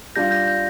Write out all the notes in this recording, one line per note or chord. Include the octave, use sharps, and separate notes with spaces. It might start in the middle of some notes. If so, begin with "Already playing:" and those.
G3 D4 F4 G6 A#6
G6 A#6
G6